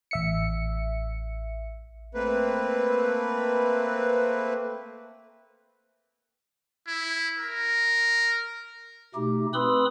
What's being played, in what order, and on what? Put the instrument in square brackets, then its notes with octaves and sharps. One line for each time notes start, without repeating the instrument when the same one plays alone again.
[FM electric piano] A1 E5 C#7
[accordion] A3 A#3 C4 B4
[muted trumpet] E4
A#4
[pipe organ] B2 A3 D#4 G4
C4 B4 B5 C6 D#6 E6